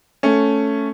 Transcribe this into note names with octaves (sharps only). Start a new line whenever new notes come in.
A3 C#4